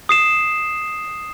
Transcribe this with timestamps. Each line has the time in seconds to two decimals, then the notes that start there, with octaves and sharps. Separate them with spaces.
0.09 D#6 C7 E7